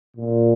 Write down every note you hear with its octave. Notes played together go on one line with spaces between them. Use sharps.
A#2